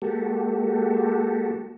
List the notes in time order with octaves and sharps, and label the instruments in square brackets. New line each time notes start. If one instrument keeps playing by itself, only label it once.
[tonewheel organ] G#3 A#3 F#4 G4 A4